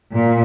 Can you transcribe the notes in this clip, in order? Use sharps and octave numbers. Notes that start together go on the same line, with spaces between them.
A#2